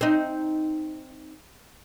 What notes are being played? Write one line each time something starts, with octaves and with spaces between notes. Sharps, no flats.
C4 D#4